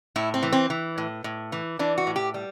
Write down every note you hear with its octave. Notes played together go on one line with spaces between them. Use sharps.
A2 E4
C4
E3
C4
E3
A2
A2
E3
E3 D4
F#4
A2
G4
G3